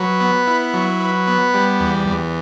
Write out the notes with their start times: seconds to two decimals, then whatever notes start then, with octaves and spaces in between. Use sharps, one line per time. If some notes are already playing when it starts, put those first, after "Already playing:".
Already playing: F#3 B4
0.21 B3
0.47 E4
0.74 F#3
1.00 B4
1.27 B3
1.54 G3
1.80 E2
2.07 E2